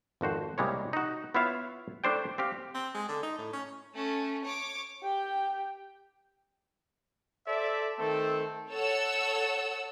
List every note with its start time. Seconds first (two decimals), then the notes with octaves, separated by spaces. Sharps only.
0.21 G#1 F2 F#4 C5
0.58 C2 G3 G#3 A#3 C#5
0.93 D#4 F#4
1.35 B3 E4 F4 C#5 E5 F5
2.04 A3 D4 E4 C5 D5 G5
2.38 C4 G4 F5
2.75 C4
2.95 G#3
3.08 D3
3.23 D#4
3.38 A2
3.53 C#4
3.94 A3 C#4
4.44 C#5 D6
5.02 G4 G5
7.47 A4 C5 D5 E5
7.99 D#3 A3 C4 A4
8.70 A4 C#5 F#5 E6